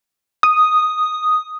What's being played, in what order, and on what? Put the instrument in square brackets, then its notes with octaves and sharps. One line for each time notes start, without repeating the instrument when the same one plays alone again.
[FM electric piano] D#6